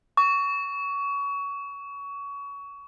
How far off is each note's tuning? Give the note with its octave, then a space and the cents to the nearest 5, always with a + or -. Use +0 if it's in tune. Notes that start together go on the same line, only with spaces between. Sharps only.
C#6 +25